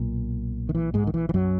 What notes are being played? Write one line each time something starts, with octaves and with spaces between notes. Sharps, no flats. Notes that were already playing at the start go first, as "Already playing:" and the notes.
Already playing: B1 A#2
D#3
E3
G#2 G#3
D#3
E3
E3
F#2 F#3